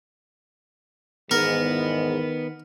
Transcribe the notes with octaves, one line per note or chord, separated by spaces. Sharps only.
E2 G#2 D#3 B3 A#4